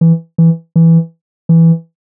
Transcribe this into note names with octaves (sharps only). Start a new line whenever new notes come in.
E3
E3
E3
E3